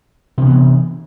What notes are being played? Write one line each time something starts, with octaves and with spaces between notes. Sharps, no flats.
C3 D#3 E3 B3